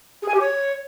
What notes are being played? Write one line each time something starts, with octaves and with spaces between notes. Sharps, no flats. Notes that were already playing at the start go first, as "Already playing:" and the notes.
G#4
G#5
G4
C#5